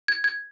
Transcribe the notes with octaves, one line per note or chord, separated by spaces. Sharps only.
G#6
G#6